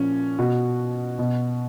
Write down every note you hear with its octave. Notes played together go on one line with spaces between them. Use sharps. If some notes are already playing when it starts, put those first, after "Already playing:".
Already playing: A#2 F3 C#4
B2 F#4
B2